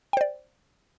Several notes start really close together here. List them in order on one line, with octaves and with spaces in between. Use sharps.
G5 C5 D5